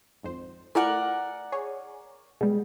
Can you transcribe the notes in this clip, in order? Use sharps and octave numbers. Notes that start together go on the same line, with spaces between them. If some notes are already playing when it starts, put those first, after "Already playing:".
G#1 F2 C5
A3 E4 F4 A#4 D5 F#5 G#5
G#4 C#5
B2 G3 G#3 G#4